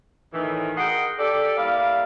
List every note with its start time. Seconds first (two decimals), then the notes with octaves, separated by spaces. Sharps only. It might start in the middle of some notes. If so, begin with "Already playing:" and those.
0.33 A2 D#3 E3
0.77 G#4 A#4 D#5 F#5 G5 C6
1.18 G4 A4 D5
1.57 G3 A#3 E4 D5 F5